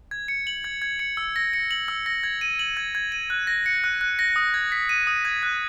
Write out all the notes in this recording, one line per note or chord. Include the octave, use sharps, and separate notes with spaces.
G#6
C#7
F#7
G#6
G#6
C#7
E6
A#6
C#7
F#7
E6
A#6
G#6
D#7
F#7
G#6
G#6
D#7
F#6
A#6
C#7
F#6
F#6
A#6
D#6
G#6
B6
D#7
D#6
G#6
F#6